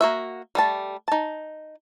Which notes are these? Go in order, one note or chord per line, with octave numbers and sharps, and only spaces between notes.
A#3 F#4 E5
G3 A3 A5
D#4 A5